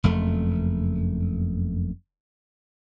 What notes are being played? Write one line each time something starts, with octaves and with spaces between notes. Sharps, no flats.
F#1 F2 A3